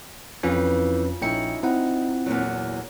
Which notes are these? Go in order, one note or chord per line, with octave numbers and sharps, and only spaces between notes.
F2 E3 F3 C#4 F4
A#1 C#4 D#4 E4 G5 C#7
C4 D#4 E4 F#5
E2 A#2 F#3